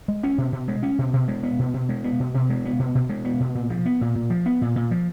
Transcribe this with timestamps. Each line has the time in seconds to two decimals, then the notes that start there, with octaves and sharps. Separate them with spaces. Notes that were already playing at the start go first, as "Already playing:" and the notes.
0.08 G#3
0.24 C#4
0.38 B2
0.53 B2
0.68 G#3
0.83 C#4
0.99 B2
1.13 B2
1.28 G#3
1.43 B3
1.59 B2
1.74 B2
1.89 G#3
2.04 B3
2.20 B2
2.34 B2
2.50 G#3
2.65 B3
2.79 B2
2.95 B2
3.09 G#3
3.25 B3
3.40 B2
3.55 A#2
3.70 F3
3.86 B3
4.01 A#2
4.15 A#2
4.30 F3
4.46 B3
4.62 A#2
4.76 A#2
4.91 F3